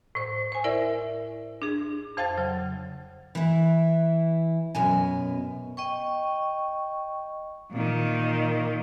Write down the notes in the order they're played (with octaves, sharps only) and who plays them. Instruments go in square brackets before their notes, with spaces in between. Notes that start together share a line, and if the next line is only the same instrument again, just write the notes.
[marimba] A2 C5
C5 G#5
E4 A#4 D5 E5
D4 G#4
F2 C5 F5 G5 A5 A6
C#3 F#3
[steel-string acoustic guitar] E3 E4
F#2 B2 G#5
[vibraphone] D#5 G5 C#6
[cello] A#2 D#3